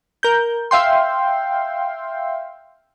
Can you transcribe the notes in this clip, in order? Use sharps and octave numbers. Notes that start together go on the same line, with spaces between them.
A#4 G6
E5 F5 G5 C6